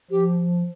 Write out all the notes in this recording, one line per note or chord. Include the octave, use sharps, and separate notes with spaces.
F3 G4